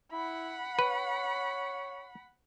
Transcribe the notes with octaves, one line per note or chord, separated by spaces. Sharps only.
E4 F#5 B5
B4 C#5